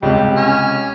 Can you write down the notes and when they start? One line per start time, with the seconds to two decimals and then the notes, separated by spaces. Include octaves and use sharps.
0.03 C#2 C3 G3
0.36 C#4